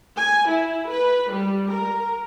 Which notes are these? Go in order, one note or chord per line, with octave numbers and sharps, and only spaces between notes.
G#5
E4
B4
G3
A#4